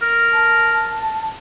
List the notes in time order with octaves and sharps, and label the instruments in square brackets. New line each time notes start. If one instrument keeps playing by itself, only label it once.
[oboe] A#4
[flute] A5